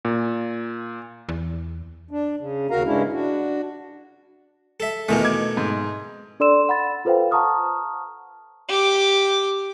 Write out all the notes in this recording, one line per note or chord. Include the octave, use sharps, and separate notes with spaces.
A#2
E2
D4
C#3
D#2 C#3 F#4 A#4 F5 A#5
G2 C#3 G#3 C#4 D4 E4
D4 F#4
A4 E5
E2 B2 D#3 A3 A#3
D6 G#6
G#2
D4 A4 D5 C6 E6 E7
F#5 B5 A6
F4 A4 B4 C5 F5 G5
F#5 A5 A#5 C#6 D#6 F6
G4 D6